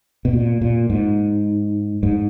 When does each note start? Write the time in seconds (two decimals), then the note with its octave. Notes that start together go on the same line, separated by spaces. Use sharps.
0.25 B2
0.33 A#2
0.61 A#2
0.90 G#2
2.03 G#2